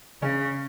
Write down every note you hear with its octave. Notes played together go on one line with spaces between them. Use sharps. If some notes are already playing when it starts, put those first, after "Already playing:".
C#3 C#4